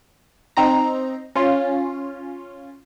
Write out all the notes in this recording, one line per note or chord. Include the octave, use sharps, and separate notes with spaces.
C4 D#4 A#5
C#4 F4